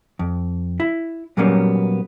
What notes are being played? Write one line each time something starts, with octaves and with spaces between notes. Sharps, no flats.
F2
E4
A#2 F#3 G3 A#3 B3 C#4